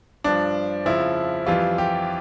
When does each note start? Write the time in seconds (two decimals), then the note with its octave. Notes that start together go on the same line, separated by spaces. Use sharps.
0.24 G2 F3 D4
0.85 F2 C#3 F3 E4
1.46 F2 E3 G3 F4
1.78 G4